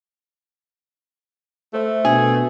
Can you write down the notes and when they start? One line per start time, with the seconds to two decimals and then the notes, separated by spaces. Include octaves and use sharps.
1.73 A3 A4 C5 E5
2.05 B2 D4 G#4